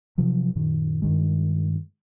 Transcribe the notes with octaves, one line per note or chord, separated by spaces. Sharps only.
C3 F3 F#3
F#2 A#2 D#3
G2 D#3 G#3